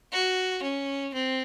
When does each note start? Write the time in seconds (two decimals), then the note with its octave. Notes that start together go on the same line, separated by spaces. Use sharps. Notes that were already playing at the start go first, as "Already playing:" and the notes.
0.12 F#4
0.62 C#4
1.14 C4